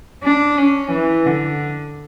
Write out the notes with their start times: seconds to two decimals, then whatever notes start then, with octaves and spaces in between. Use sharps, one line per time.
0.23 D4
0.57 C#4
0.91 E3
1.26 D3